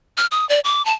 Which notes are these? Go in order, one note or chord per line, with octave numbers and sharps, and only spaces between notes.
F6
D#6
D5
D6
A5